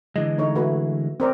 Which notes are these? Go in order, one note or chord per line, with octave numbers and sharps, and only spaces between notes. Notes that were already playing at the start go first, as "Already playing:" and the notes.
D3 E3 G#3 D#5
A3 D#4 C#5
A3 F#4 B4
C4 A#4 D5